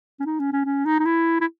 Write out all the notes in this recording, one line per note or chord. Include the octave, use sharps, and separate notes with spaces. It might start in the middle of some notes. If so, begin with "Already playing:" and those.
C#4
D#4
C#4
C#4
C#4
D#4
D#4
E4
E4